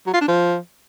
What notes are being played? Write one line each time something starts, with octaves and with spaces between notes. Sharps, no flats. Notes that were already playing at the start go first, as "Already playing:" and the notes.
F#3
F4
D4
F3